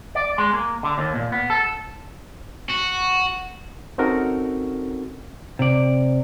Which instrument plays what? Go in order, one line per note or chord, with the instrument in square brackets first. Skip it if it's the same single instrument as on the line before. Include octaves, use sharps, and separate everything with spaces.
[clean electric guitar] D5
G#3
A#3
D3
D#2
A#2
B3
A4
[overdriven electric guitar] F#4
[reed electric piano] C4 C#4 D#4 F#4 A4 A#4
[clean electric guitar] C3 D5